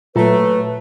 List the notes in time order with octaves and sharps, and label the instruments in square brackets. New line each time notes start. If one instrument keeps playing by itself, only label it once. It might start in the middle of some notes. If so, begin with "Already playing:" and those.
[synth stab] A#2 [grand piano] F#3 A#5 [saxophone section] A3 [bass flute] B4